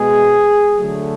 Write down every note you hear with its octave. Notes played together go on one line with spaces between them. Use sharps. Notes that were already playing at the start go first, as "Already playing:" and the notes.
Already playing: B2 G#3 B3 G#4
D3 F#3 A3